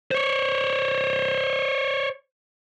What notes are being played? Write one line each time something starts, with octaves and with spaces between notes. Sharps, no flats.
C5 C#5